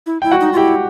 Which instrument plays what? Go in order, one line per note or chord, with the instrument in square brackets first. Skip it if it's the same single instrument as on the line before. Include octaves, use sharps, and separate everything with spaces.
[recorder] E4
[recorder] E4 [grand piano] G5
[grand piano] F#4 F#5
[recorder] D#4
F4
[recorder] E4 [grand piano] G4 G5